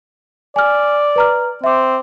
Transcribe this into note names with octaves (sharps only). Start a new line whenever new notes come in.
D5 G#5 F6
B4 A#5 F6
C4 E5 D6